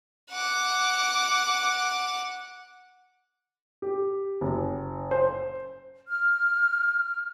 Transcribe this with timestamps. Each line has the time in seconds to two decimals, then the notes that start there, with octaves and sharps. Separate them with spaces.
0.31 F#5 D6
3.82 G4
4.41 F#1
5.11 C5
6.08 F6